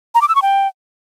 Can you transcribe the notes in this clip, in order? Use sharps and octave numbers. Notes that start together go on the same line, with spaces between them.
A#5
D6
E6
C#6
G5